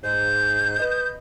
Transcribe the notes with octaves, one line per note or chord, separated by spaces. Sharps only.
G#2 G6
B4 D#5